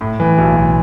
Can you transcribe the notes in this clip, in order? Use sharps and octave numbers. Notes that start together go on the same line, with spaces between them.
A2
E3
B1
B1